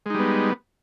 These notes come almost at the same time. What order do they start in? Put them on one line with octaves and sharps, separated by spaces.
G#3 D#4 G3 B3